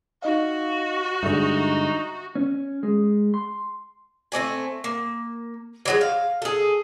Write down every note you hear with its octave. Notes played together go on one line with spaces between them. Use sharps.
D#4 F#4 D#5 F5
G2 D3 G#3 D#4 E5 C#6
C#4
G#3
C6
A3 C4 D5 G#5
A#3
E3 F#3 G#3
F5
G#4 A4